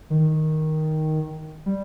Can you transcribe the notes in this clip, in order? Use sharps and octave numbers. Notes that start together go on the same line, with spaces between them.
D#3
G3